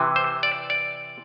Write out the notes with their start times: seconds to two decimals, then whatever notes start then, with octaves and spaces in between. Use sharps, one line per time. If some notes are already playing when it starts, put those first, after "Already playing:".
Already playing: C3 E3
0.16 C5
0.43 D5
0.70 D5